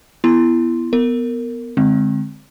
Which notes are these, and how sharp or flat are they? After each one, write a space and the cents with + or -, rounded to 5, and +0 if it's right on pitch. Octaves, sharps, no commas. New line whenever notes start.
B3 +0 E4 +20 C6 +0
B3 +0 A#4 -20
D3 +15 G#3 +0 C4 +0